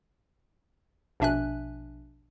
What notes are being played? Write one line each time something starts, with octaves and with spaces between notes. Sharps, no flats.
A#1 B2 D4 E5 G#5 F#6